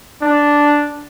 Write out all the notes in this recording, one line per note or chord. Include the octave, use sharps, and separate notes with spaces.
D4